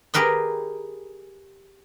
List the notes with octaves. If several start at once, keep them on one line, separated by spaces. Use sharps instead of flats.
G4 G#4 A#4 B4 D#5